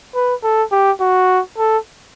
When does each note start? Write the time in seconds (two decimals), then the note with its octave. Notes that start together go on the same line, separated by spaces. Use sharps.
0.15 B4
0.43 A4
0.72 G4
1.00 F#4
1.58 A4